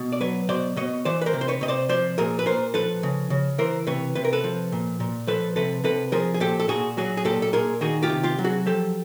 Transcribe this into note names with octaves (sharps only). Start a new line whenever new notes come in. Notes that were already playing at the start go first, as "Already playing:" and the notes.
Already playing: B2
D5
F#3 B4 C#5
B2 C5 D5
B2 C#5 D#5
E3 C5 D5
B4
A#4 C5
C3
C5
B4 C#5
C3 D#5
C5 D5
F3 C5 D5
A#2 G#4 A#4
B4
A#2 A#4 C5
F3 A4 B4
C#3
C#3
E3 A#4 C5
C3 B4 C#5
C3 B4
A#4
A4 B4
F3
A#2
A#2
F3 A4 B4
C3 A4 B4
C3 A4 B4
F3 G#4 A#4
G#4
A#2 G4 A4
A4
A#2 F#4 G#4
F#3 F#4 G#4
G#4
A#2 G4 A4
A4
A#2 G#4 A#4
D#3 F#4 G#4
F4 G4
C3
F4 G4
F#3
F#4 G#4
F3 G4 A4